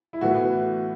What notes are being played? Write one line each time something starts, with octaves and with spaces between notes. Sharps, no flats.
E4
A2 E3 B3 F#4